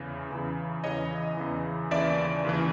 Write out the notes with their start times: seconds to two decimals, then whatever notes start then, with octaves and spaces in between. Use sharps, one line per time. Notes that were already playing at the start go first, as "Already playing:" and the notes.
Already playing: E2 C#3 E3
0.30 E2 C#3 E3
0.84 E2 C#3 E3 C#5 D#5
1.37 E2 C#3 E3
1.91 D#2 C#3 E3 D5 E5
2.45 D#2 C#3 E3